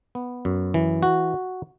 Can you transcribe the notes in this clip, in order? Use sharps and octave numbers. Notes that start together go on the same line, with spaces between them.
B3
F#2
E3
F#4